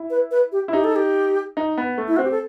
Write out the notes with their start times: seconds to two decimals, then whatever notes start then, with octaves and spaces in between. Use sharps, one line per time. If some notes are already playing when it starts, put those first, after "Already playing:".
Already playing: E4
0.10 B4
0.31 B4
0.52 G4
0.68 E4
0.73 D#4 G4
0.84 A4
0.96 G4
1.57 D#4
1.77 B3
1.98 A3
2.08 E4
2.17 C4 F#4
2.24 G4
2.31 A4